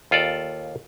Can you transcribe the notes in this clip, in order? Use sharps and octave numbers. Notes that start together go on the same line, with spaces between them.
D#2 F4 A4 D5